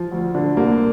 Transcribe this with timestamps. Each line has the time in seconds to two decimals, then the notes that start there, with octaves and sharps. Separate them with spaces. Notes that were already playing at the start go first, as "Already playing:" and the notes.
Already playing: F3
0.12 D2
0.35 D3
0.57 C2 A#3